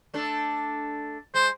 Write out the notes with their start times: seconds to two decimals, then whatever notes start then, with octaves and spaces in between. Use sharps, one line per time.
0.14 A3 D4 A4
1.34 G#3 C5